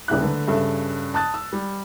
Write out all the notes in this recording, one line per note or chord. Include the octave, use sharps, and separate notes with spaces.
D#1 C#3 E4 F#6
D3 A3 B4
G2 C#3 A4 E5
A5 D#6 F#6 A6
E6
G3